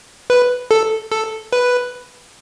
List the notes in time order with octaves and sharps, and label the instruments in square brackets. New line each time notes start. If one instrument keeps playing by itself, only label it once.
[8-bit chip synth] B4
A4
A4
B4